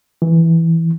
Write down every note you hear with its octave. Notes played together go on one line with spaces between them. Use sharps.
E3